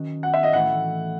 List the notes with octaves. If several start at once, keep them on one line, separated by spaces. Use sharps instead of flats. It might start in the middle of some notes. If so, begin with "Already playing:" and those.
Already playing: D#3 F#3 C#4 F#4
F#5
E5
D#5
A2 E3 A3 E4 F#5